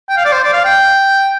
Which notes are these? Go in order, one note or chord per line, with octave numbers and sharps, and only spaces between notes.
G5
F5
D5
C5
D5
F5
G5